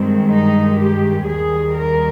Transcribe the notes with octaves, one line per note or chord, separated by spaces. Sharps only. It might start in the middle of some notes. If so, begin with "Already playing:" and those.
Already playing: G2 D#3 G#3 C4
D#4
G4
D#2 D#3 G3 G#4
A#4